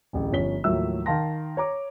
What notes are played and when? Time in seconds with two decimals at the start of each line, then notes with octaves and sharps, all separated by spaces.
0.13 D1 A1
0.32 G1 F3 C#4 C#5 B6 G7
0.64 D#2 A2 F3 F#3 E5 E6
1.06 D#3 F5 A5 C6 A#6
1.57 C#5 A#5 D6